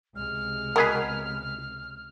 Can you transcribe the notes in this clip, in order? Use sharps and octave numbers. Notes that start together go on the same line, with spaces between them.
C#2 C3 G#3 F6
B2 G#4 A#4 B4